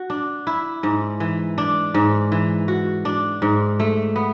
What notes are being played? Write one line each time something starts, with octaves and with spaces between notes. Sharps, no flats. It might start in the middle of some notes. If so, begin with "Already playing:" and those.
Already playing: F#4
D4
E4
G#2
E3
D4
G#2
E3
F#4
D4
G#2
A3
B3